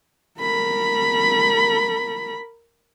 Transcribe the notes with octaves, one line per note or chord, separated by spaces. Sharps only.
A#4 B5